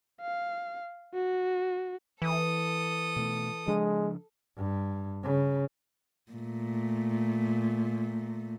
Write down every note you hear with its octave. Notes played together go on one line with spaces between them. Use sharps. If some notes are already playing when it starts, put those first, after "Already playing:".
F5
F#4
E3 A4 D#6
B2 A3
C#3 F3 G#3 D4
G2
C#3
A#2 A3